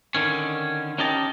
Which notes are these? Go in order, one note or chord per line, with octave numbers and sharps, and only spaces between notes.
D3 D#3 C#4
C#4 D#4 G4 D#5 A5